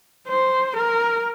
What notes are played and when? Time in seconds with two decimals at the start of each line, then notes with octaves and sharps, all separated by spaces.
0.28 C5
0.77 A#4